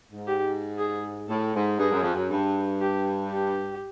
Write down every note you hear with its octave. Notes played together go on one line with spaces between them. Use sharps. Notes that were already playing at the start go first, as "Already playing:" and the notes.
G#2
G4
G#4
A2 A4
G#2
G2 G#4
F#2
F2
F#2
G2
G4
G4